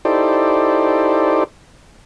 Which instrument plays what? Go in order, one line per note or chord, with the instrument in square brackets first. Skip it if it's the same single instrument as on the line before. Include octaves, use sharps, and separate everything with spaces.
[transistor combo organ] D#4 E4 G4 A4 C5 D5